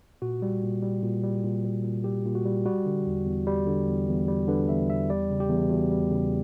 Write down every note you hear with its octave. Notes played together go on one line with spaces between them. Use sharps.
A#2 F#4
G3
A#2
G3
A#2
G3
A#2
G3
A#2
G3 G4
A#2
F#4
G3
G3 F#4
D3
E2
E2
G3
D3
E2
E2
G3
D3 B4
E2 E5
E2 E5
G3 D5
C#3
G4
E2
E2 F#4
G3
C#3